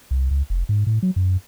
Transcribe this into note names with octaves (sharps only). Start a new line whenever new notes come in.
C2
C#2
F1
G#2
A2
F#3
F#2